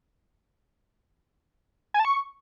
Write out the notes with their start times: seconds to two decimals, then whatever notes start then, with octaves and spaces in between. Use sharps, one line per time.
1.94 G#5
2.00 A5
2.05 C#6